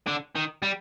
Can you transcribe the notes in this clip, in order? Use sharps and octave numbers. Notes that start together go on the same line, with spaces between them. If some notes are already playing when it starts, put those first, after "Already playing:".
D3
D#3
G3